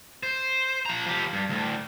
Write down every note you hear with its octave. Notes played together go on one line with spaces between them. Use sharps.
C5
F3 A#5
F3 G4
G2
D2 A2